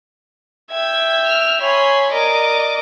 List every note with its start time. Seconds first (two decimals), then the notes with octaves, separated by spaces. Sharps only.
0.71 E5 G5 G#6
1.27 F6
1.61 C#5 G#5 B5 C6
2.12 A#4 D5 D#5 D6